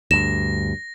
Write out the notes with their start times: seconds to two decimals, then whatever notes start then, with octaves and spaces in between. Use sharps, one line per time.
0.11 D2 G2 A#6 E7